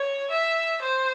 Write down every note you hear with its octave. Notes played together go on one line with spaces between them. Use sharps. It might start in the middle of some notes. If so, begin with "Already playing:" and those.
Already playing: C#5
E5
C5